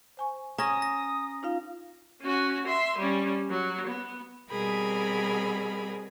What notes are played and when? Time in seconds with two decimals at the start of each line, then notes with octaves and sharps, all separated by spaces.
0.17 C5 G#5 C#6
0.58 C#4 A#5 D#6 A#6
0.82 A#6
1.43 D#4 F4 F5
2.22 C#4 F#4
2.67 E5 C6
2.98 G3 C#4
3.50 F#3
3.87 B3
4.49 B2 G3 C4 G#4 A#4 B5